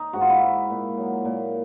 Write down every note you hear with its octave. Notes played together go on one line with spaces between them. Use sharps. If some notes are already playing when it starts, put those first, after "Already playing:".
Already playing: D#4
G#2 F#4
F4
E4
G#2
A#2
F#3
A#2